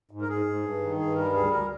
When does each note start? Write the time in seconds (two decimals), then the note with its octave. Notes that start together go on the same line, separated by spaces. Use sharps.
0.11 G#2
0.22 A#4
0.28 G#2 G#4
0.46 G#2
0.63 G2
0.81 D#3
0.98 G2 G#4
1.16 G3 A#4
1.34 D2 G#4
1.51 D2 A#4